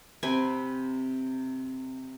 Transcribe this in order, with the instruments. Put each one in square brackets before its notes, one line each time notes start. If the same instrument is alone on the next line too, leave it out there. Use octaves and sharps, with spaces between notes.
[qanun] C3 C4 B4 G#5